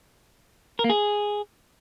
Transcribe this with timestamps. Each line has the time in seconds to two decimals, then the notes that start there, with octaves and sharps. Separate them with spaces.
0.79 A#4
0.84 A#3
0.90 G#4